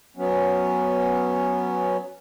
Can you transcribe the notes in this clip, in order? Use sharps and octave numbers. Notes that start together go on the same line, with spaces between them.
F#3 B3 C#4